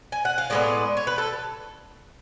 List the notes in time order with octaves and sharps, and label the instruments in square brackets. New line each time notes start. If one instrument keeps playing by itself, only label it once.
[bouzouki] G#5
F#5
F5
A2 G#3 B3 D5
C#5
B4
A4